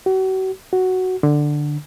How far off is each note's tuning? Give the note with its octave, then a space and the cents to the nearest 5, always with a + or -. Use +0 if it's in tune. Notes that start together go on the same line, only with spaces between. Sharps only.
F#4 +40
F#4 +5
D3 +10